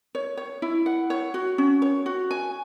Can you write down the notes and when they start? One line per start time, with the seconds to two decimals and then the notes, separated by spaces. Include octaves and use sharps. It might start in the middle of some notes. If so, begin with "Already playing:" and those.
0.15 C#5
0.37 C#5
0.62 E4
0.86 F#5
1.10 C#5
1.34 F#4
1.58 C#4
1.82 C#5
2.06 F#4
2.31 G#5